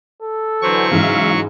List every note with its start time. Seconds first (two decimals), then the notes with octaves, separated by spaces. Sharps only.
0.22 A4
0.62 D3 E3 F#3 C5 C#6
0.92 G#2 C#3 E3 E5 F5